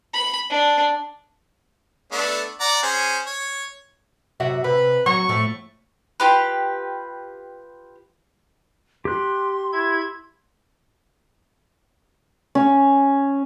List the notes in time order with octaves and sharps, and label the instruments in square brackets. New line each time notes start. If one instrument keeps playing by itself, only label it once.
[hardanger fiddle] B5
D4
[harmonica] A3 B3 D4
D5 F#5 A#5
C#4 G#4 C5
C#5
[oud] F#2 C3 E5 [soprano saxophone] F#4
[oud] C3 [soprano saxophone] B4
[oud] F#3 F#4 [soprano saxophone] C#6
[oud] A2 F3 A3
[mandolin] F4 G4 B4
[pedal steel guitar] G4 F#6 [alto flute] C6
[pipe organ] E4 G#6
[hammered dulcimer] C#4